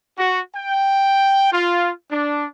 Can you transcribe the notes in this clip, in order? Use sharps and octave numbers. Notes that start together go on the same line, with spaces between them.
F#4
G5
F4
D4